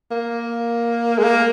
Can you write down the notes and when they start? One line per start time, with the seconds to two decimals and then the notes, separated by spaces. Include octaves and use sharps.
0.11 A#3
1.18 G#3
1.24 A#3